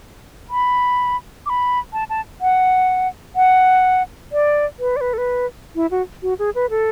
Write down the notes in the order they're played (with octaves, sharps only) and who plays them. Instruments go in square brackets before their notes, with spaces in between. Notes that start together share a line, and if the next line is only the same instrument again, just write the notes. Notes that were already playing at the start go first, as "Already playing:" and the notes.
[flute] B5
D6
B5
A5
A5
F#5
F#5
D5
B4
D5
B4
A4
B4
E4
F#4
F#4
G#4
B4
A4